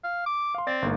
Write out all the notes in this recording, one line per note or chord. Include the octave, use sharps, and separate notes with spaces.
F5
D6
F5 C6
C4 D5 A6
G1 G#2 A#3